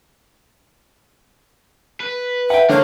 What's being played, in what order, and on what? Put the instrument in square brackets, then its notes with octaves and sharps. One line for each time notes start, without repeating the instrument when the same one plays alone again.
[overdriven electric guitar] B4
[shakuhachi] E5 [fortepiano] F#5 G5
[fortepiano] D3 [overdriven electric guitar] A#4 F5 [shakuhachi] C#5